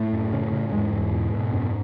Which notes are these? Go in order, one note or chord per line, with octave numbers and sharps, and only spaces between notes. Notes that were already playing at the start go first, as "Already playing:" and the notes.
Already playing: A2 A3
F#2
C#3
C#3
E2 G#2 G#3
E2
B2
B2
F#2